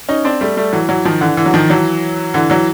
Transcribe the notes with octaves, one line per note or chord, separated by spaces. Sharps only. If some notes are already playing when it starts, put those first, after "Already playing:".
C#4 D#4
C4 D4
G3 A3
G3 A3
E3 F#3
E3 F#3
D#3 F3
D3 E3
D3 E3
F#3
D#3 F3
E3 F#3
D3 E3
E3 F#3